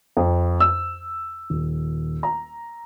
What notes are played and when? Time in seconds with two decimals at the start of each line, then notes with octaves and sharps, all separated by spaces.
0.17 F2
0.60 E6
1.50 D#1
2.23 A#5